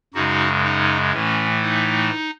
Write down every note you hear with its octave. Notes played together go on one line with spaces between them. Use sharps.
F#2 C#3 G#3 D#4 F#4
D#4
A2 E3 A3 C#4
D#4